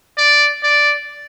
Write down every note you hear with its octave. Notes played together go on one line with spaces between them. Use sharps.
D5
D5